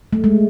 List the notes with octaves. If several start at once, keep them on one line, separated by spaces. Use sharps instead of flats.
A3
G#3